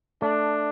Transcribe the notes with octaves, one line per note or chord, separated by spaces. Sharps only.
A3 D4